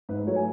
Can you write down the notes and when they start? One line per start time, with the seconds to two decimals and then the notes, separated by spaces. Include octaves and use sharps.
0.09 G#2 B4
0.19 B4
0.27 F#3 A3 C#5
0.36 G#5